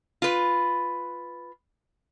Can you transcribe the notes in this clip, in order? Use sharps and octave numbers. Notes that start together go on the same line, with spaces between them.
F4 B4